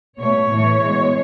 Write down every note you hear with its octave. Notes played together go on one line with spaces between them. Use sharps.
B2 A3 C#5
A2 E3 A3
B2 G#3